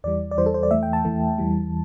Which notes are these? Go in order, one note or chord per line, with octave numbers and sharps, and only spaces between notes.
E2 E3 G3 D5
D5
E2 E3 G3 C5
A4
C5
D5
E2 E3 A3 E5
G5
A5
E2 E3 A3
E2 E3 G3